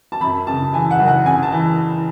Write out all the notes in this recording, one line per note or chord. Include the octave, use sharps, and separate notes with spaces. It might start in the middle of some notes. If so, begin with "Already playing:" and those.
A5
F#2 B5
C#3 A5
E3 G#5
F#5
F#1
F#5
C#3 G#5
A5
E3